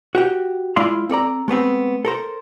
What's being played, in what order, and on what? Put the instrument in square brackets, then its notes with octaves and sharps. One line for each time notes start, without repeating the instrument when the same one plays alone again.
[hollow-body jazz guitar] F#4 G4 G5
G#3 E4 F4 D5 F5 C6
C4 A4 D5 A#5
G#3 A3 B3 C4
A4 A#4 C5